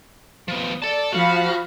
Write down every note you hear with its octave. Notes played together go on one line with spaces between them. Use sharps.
F3 B3
A4 D5 A5
F3 F#4 F5 B5